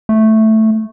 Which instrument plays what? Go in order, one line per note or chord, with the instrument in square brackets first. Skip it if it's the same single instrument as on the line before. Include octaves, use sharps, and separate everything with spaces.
[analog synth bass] A3